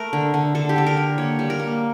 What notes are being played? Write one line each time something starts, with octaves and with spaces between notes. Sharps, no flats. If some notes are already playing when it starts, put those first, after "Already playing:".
Already playing: A3 A#4
D3
D3
D3 A4
G4
D3 A4
A#4
D3
A#3 C#5
G3
A#4
A#3